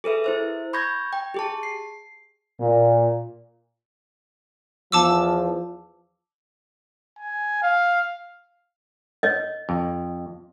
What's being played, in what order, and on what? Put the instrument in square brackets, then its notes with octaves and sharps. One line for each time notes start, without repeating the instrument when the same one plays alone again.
[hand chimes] G#4 A4 B4 E5
E4 C5 E5
B5 C#6 G6 G#6 A#6
G5
G4 G#4 A5
C7
[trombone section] A#2
[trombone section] E2 F3 [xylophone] A5 D6 E6
[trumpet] G#5
F5
[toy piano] C#5 D#5
[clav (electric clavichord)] F2